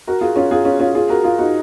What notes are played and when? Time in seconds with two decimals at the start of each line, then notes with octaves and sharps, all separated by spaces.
0.07 F#4 A#4
0.21 F4 G#4
0.36 C#4 F4
0.51 F4 G#4
0.65 C#4 F4
0.80 C#4 F4
0.95 F4 G#4
1.09 F#4 A#4
1.24 F4 G#4
1.38 D#4 F#4